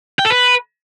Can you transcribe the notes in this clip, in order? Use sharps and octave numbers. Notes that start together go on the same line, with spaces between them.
G5
A4
B4